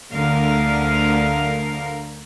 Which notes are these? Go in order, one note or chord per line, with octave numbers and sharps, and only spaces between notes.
D2 D3 A#4 F5